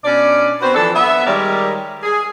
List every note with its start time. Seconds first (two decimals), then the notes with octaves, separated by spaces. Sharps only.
0.04 B2 C#4 D4 D5
0.61 B3 C4 F#4 B4 C5
0.74 E3 F3 D4 A4
0.95 B3 E5
1.25 D#3 G3 G#3 A#4 C#5 D5
2.03 G#4